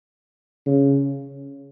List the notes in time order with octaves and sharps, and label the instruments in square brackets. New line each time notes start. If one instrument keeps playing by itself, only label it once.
[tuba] C#3